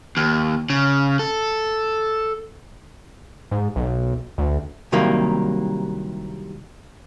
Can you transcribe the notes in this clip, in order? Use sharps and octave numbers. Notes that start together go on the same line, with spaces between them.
D#2
C#3
A4
G#2
B1
D2
C2 D#3 F#3 G3 A#3